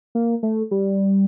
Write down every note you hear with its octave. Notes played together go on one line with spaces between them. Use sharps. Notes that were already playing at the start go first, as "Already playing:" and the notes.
A#3
A3
G3